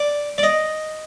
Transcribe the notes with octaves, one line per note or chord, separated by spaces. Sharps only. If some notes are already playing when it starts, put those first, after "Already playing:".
Already playing: D5
D5
D#5